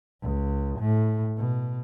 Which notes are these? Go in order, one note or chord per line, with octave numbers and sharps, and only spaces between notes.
C#2
A2
B2